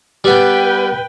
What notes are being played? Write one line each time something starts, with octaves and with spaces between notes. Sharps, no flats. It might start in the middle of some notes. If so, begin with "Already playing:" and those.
G3 B3 B4 G5